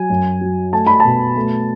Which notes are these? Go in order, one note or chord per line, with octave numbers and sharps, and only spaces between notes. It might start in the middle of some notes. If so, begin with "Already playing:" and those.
Already playing: F#3 G#5
F#2
F#3
A3 A5
B5
B2 A5
A3